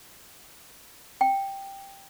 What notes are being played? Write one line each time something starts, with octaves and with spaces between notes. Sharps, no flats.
G5